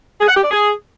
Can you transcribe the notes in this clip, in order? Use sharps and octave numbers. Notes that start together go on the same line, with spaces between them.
G#4
F#5
G4
D5
G#4